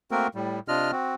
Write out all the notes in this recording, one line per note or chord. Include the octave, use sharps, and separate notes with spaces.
A3 A#3 C4 F#4 A#4
A2 G3
C3 D4 F4 D#5 F6
C4 F#4